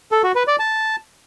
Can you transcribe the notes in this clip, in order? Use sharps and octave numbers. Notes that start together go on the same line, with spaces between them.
A4
F#4
B4
D5
A5